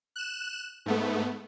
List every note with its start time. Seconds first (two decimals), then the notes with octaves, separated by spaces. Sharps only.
0.16 F#6 E7
0.86 G#2 A3 B3